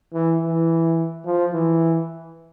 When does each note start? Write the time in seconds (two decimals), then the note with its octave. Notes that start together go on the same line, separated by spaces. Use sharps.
0.14 E3
0.41 E3
1.25 F3
1.53 E3